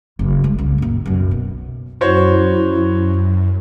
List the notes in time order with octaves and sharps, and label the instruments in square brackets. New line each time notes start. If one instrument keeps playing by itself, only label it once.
[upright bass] F#1 F#2
G3 G#3
C#2
F#2 A#2
B1 F#2
B2
[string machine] F#2 [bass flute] E4 [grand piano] F#4 C5 C#5